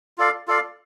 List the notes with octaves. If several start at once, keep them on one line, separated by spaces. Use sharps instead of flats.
F4 A4 D5 F5
F4 A4 D5 F5